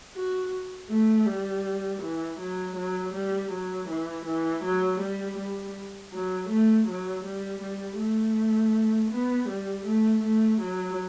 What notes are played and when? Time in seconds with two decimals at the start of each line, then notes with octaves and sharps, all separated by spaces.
0.15 F#4
0.89 A3
1.26 G3
2.02 E3
2.39 F#3
2.76 F#3
3.14 G3
3.51 F#3
3.88 E3
4.25 E3
4.63 F#3
5.00 G3
5.37 G3
6.12 F#3
6.50 A3
6.87 F#3
7.25 G3
7.61 G3
7.99 A3
9.11 B3
9.49 G3
9.86 A3
10.23 A3
10.61 F#3